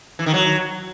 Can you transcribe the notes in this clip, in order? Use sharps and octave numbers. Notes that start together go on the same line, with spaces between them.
E3
D#3
F#3